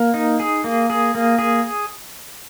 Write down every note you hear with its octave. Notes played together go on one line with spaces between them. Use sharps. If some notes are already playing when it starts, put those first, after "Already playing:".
Already playing: A#3
D#4
G#4
A#3
G#4
A#3
G#4